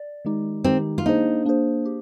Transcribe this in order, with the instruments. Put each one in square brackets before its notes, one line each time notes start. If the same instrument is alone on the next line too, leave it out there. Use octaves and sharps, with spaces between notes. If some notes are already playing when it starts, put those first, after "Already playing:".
Already playing: [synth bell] D5
D#3 G#3 D#4 G4
[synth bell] D#3 G#3 D#4 G4 [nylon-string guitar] C4
[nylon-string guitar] F4
[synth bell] A#3 D4 G#4 C5 [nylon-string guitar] D#4
[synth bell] A#3 D4 G#4 C5
G4